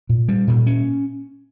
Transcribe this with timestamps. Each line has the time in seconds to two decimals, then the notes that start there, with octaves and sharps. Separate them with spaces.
0.09 A#2
0.29 G3
0.48 A#2
0.66 C#4